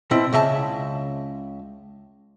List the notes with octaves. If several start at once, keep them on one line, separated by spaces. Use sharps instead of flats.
B2 C4 E4
C#2 C#3 E5 A5